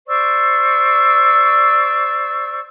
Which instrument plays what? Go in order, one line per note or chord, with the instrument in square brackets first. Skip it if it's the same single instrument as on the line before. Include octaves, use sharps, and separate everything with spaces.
[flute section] C5 D5 C#6 E6